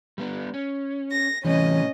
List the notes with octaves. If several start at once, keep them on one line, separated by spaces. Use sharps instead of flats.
G3 B3 D4
C#4
A#6
A2 C3 E3 G3 C#4 D#5